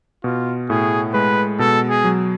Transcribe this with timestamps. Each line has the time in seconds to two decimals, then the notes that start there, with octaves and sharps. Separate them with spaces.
0.24 B2 F4
0.70 A2 G#4
1.14 G#3 B4
1.59 B2 A4
1.89 G#4
2.04 F#3